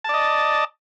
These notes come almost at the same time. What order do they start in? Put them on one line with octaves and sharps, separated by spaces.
A5 D5 D#5